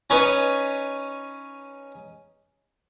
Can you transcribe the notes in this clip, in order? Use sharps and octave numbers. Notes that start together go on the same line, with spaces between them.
C#4 D#4 B4 C#5